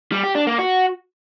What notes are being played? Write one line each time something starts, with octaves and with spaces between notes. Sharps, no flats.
G3
G4
D4
A#3
F#4